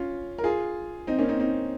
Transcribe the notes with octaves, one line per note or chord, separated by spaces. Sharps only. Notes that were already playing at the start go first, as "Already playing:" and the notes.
Already playing: C#4 F4
A#4
F4 G#4
C4 D#4
A#3 C#4
C4 D#4
C4 D#4